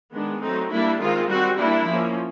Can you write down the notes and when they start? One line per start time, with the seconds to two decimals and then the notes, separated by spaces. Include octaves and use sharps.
0.13 D#3 G#3 B3 D4
0.41 F#3 A3 C4 D#4
0.70 G3 A#3 D4 E4
1.00 D#3 G#3 C4 F4
1.28 G3 C4 F#4
1.57 G3 A#3 D4 E4
1.86 F3 A#3 C#4